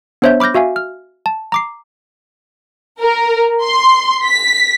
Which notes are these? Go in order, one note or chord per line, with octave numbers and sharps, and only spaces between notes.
B3 D4 C5 C#5 E5 G6
B5 D6 F6 G6 A#6
F#4 E5 F5 G#5
F6
A5
A#5 D6 C7
A#4
C6
B6